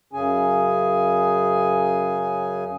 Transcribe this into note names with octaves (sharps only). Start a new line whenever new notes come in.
F#2 C#3 C#4 G#4 G#5